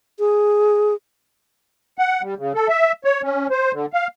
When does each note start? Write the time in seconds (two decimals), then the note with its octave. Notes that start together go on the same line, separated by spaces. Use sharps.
0.19 G#4
1.98 F#5
2.22 G3
2.38 C#3
2.55 A4
2.68 E5
3.04 C#5
3.23 C#4
3.51 C5
3.73 D3
3.93 F5